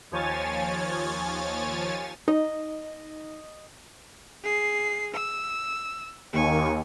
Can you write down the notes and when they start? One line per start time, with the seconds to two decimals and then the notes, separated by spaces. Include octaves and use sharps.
0.11 D#2 F3 C#5 G#5 A6
2.28 D#4 D#5
4.44 G#4 C7
5.14 E6
6.33 D#2 G#5 C#6